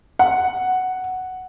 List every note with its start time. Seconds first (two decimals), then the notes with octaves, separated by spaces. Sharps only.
0.19 F#5